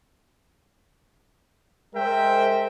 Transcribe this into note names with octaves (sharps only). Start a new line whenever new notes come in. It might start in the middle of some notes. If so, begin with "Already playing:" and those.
G#3 A#4 C5 E5 G5